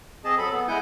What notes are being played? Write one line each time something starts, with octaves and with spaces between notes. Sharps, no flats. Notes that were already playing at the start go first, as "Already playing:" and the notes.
C4 G#4 D#5 A5
F#3 A4 B5
B3
G#3 E4 F#5 G#5 G6